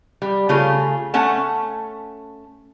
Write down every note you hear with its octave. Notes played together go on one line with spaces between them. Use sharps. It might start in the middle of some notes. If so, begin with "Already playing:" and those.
G3
C#3 A3 F4 G#4
A3 C#4 F#5 A5